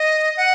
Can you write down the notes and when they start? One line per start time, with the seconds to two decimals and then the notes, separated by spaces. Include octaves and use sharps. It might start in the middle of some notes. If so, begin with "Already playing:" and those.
Already playing: D#5
0.37 F#5